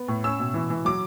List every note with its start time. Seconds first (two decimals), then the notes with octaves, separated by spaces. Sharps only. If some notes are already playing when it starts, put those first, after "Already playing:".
Already playing: B3
0.08 A2
0.24 C#4 E6
0.40 B2
0.54 E3
0.70 E3
0.85 F#3 D6